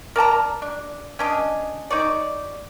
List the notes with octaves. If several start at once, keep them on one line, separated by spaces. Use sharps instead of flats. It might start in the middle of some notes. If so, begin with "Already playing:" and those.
A#4 D5 A5 A#5
D4
C#4 D4 D#5
D#4 C#5 D5